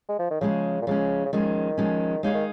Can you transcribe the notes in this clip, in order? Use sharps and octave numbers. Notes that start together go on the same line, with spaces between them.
G#3
F3
D#3
C#3 F3 G#3 C#4
A#2
C#3 F3 G#3 C#4
C#3
D#3 F3 G#3 C#4
F3 G#3 C#4
C#3 G#3 D#4 G#4 F5
D#3